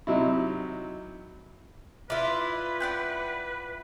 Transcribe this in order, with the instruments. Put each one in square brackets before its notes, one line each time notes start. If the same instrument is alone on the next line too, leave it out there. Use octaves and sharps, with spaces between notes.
[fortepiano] C3 F#3 D#4 E4
[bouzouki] E4 F4 [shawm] B4 [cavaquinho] D5
[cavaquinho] D5 F#5 G5